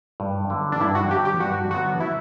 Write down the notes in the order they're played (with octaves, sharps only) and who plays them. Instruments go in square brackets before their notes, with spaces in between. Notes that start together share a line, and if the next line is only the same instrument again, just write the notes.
[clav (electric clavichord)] G2
D3 F#3 B3
[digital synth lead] D4
[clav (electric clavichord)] G2 [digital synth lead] E4
[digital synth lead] F#4
[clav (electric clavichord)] D3 F#3 B3 [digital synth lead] G4
[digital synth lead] G4
[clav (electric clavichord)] G2 [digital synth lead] F#4
[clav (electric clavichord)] D3 F#3 B3 [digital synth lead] F#4
[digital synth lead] E4